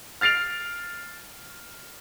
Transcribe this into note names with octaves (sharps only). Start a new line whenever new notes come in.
F6 A6 C7 D7 F7